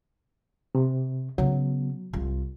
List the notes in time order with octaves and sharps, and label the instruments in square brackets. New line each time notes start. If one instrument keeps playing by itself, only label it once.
[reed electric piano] C3
[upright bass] C#3 B3 [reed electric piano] F#3
[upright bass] C2 F4